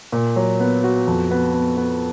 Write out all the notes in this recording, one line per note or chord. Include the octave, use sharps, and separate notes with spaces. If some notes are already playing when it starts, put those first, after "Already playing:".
A#2
F#3
B3
F#4
F2
B3
B3
B3